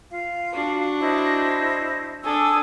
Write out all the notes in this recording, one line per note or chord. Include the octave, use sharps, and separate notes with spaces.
F4 F5
D4 F#4
E4 C5 D#5
D4 A4 G#5 D#6 E6